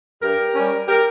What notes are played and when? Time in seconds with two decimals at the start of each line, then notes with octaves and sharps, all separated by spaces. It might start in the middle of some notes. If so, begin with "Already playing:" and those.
0.21 G2 G4 A#4
0.54 G3 C#4
0.87 G4 A#4